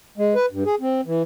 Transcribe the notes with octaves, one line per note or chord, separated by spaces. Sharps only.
G#3
B4
G2
G#4
C4
E3